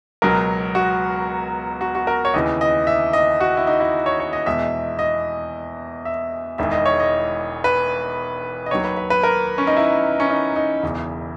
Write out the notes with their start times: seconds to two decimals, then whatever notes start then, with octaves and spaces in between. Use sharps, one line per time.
0.22 C#2 B2 F#3 A#4
0.75 F#4
1.81 F#4
1.95 F#4
2.07 A#4
2.25 C#5
2.34 D#2 C#3 E3 D#5
2.61 D#5
2.87 E5
3.13 D#5
3.40 F#4
3.57 E4
3.67 D#4
3.80 E4
4.06 C#5
4.20 C#5
4.33 D#5
4.46 E2 B2 G#3 E5
4.99 D#5
6.05 E5
6.58 E1 E2 D#3 G#3 E5
6.72 D#5
6.86 C#5
7.00 D#5
7.64 B4
8.66 D#5
8.71 D#2 D#3 F#3 C#5
8.84 B4
8.97 B4
9.10 B4
9.23 A#4
9.58 C#4
9.67 D#4
9.77 E4
10.20 C#4
10.30 D#4
10.56 D#4
10.83 E1 E2 C#3